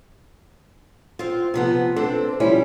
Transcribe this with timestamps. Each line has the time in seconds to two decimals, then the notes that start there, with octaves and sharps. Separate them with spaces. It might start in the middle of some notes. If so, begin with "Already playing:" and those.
1.19 C4 F4
1.54 C3 F3 B3
1.96 C4 D4 A4 C5
2.40 F3 G3 C#4 E4